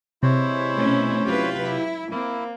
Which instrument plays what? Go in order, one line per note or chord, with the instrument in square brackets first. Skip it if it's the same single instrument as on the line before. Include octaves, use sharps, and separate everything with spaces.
[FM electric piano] C3 [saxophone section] E3 G#3 E4 [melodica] C5 C#5
[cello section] B2 A3 C#4
[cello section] F#3 E4 B4 [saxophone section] F4 G4
[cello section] E4
[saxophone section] A#3 [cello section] C4 [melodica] E4